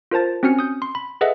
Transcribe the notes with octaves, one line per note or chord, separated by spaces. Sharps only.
F4 A#4 C5 A5 A6
C4 C#4 F#4 G#5 F6 C#7
D#6 G6
C6
B5
G#4 A4 B4 D#5 E5 F#5